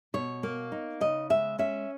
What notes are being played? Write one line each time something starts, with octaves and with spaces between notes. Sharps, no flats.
B2 C#5
A#3
D#4
C#3 D#5
G#3 E5
C#4 E5